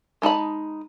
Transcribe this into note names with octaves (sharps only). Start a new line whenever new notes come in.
G#3 D#4 A5 B5